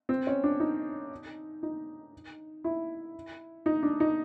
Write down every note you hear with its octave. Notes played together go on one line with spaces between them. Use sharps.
C4
C#4
D4
D#4
D#4
E4
D#4
D4
D#4